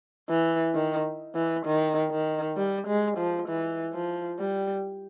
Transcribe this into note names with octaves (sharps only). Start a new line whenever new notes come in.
E3
D#3
E3
D#3
D#3
G3
G#3
F3
E3
F3
G3